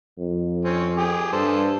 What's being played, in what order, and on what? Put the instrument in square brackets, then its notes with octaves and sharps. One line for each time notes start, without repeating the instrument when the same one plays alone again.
[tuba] F2
[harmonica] C4 C#4
G4 G#4
[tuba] G2 [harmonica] A4 C5